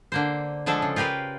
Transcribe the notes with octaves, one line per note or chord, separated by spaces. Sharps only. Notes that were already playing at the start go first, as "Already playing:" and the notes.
D3 A#3 C5
D3 F3 G#3 D4 A4
C#3
F4 G4 A#4 B4 F5